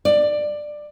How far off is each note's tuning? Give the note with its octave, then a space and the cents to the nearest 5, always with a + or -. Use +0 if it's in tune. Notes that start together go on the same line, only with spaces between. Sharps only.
D5 +15